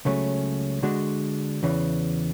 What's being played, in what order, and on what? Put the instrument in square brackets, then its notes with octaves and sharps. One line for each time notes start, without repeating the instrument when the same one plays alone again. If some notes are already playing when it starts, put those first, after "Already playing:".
[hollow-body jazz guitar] C#2 C#3 F#3 A3 C#4
D3 G#3 D4 F#4
E2 C#3 E3